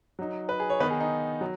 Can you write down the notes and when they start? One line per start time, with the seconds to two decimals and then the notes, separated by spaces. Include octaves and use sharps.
0.19 F#3 D#4
0.49 B4
0.60 G#4
0.70 C#5
0.80 D#3 B3 D#4 B4
0.90 G#4
1.00 D#4
1.41 F#3